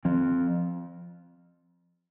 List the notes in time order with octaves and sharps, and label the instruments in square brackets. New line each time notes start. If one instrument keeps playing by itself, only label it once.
[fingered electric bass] F3 C4